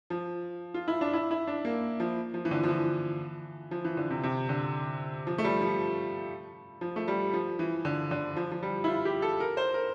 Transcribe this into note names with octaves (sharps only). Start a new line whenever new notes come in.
F3
F4
E4
D4
E4
E4
D4
A#3
F3
F3
E3
D3
F3
E3
F3
E3
D3
C3
C3
D3
F3
A3
G3
F3
F3
A3
G3
F3
E3
D3
D3
F3
F3
G3
E4
F4
G4
A4
A#4
C5
A#4